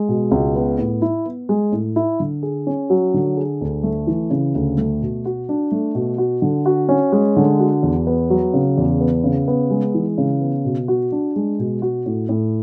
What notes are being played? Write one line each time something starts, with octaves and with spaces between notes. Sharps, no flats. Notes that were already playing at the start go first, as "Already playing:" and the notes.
Already playing: G#3
B2
C#2
B3
A2
E4
B3
G#3
A2
E4
D3
G#4
C#4
F#3
D3
G#4
D2
A3
E3
C#3
D2
A3
B2
F#4
D4
A3
B2
F#4
D3
F#4
C#4
G#3
D3
F#4
E2
B3
F#3
C#3
E2
B3
C#3
B3
G#3
E3
C#3
B3
B2
F#4
D4
G#3
B2
F#4
A2
A2